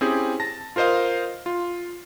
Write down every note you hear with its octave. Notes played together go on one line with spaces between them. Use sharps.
C4 C#4 E4 G4 G#4
A5 A#6
F4 A#4 C5 D#5 F5
F4